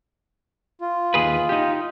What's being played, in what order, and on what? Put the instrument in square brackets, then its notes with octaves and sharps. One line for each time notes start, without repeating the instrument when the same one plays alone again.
[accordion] F4
[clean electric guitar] D#2 G#4 B4
D#4 G4